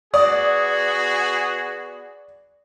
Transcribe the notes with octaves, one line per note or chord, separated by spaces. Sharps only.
B3 F#4 G#4 D5 D#6